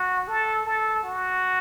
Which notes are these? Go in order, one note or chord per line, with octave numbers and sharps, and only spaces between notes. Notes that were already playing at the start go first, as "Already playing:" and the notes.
Already playing: F#4
A4
A4
F#4